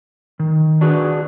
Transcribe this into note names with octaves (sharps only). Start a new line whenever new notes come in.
D#3
D4 F#4 G#4 B4